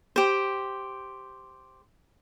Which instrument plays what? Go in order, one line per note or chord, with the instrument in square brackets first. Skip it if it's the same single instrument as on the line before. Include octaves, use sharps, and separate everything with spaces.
[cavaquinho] G4 C5